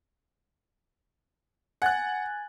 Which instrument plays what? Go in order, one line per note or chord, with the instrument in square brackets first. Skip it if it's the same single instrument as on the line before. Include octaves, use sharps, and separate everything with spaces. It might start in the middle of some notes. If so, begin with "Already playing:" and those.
[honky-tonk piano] F#5 F#6 [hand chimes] G#5 G#6 A6